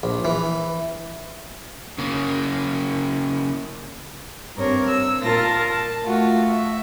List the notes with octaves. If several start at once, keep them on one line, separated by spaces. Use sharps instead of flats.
A#1
E3
C#3 A#3
G2 C4 A#4 C#5
E6
A#2 F4 A#4 A5 A#6
A5
A3 F4 F#4
E5